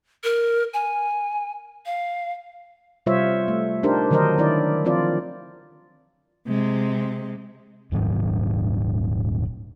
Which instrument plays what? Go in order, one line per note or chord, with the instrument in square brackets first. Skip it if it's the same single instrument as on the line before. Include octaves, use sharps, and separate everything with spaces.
[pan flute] A#4
G#5
F5
[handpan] C3 G3 F4 C5 C#5 E5
A3
D4 D#4 G4 A#4 C5
D3 D#3 F#3 A#4 C5 D#5
D#3 D4 E4 D5
F3 C4 F4 D5
[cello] C3 G#3
[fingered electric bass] D#1 G#2 D#3 F#3